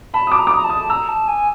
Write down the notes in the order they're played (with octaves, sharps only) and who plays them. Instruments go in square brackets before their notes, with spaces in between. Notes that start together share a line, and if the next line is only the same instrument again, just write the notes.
[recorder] A5 [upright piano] B5
[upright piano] D#6
D6
[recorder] A#5
[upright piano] D6
D#6
[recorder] A#5
A5
[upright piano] D#6
[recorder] A#5 [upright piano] E6
[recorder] A5
G#5